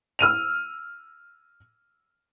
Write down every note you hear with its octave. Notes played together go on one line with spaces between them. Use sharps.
E6 F6 D#7 F7